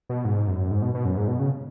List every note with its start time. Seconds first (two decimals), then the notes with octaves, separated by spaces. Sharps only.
0.09 B2
0.25 G#2
0.48 F#2
0.71 G#2
0.82 B2
0.94 B2
1.05 F#2
1.17 G#2
1.28 B2
1.39 C#3